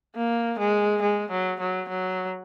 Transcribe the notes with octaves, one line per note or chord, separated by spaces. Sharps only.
A#3
G#3
G#3
F#3
F#3
F#3